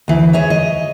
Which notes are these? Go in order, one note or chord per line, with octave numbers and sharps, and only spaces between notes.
D2 E3
G#4 C#5 E5
D#5